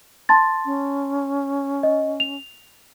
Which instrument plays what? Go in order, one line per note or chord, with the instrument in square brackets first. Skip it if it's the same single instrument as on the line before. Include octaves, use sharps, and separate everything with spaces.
[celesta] A5 C6 A6
[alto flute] C#4
[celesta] D#5
F7